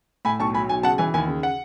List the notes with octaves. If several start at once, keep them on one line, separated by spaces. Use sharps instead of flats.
A2 G#5 B5
B1 A5 C#6
F#3 G#5 B5
B1 G#5
C#3 F#5 A5
E3 G#5
D#2 G#5
C#3
F#5